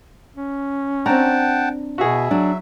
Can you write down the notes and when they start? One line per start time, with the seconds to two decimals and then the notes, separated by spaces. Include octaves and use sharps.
0.36 C#4
1.06 C4 D4 F#5 G5 A5 A#5
1.98 B2 F#4 G#4 E5
2.31 F#3 D4